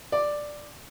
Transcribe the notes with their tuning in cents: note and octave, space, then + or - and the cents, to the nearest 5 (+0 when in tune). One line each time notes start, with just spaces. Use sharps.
D5 +5